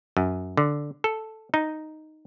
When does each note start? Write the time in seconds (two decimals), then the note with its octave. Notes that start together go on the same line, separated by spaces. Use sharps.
0.17 F#2
0.57 D3
1.04 A4
1.54 D#4